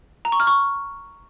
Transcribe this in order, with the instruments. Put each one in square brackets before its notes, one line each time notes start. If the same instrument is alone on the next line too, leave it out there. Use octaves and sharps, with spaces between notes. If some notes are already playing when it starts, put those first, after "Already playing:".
[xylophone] A#5
C#6
F6
C#6